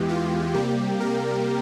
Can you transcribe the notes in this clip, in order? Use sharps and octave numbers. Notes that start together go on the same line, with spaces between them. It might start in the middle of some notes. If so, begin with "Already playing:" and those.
Already playing: E2 E3 G#3 G4
F4
C3 G3 A#3 G4
A#4